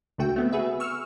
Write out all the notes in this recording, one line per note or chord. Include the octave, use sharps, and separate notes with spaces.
C#2 D3 A3 F#4 G5
A3 B3 C4
F#4 G#4 B4 E5
C#6 E6 F6